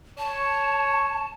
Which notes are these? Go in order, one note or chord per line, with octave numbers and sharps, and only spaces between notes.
C#5 A5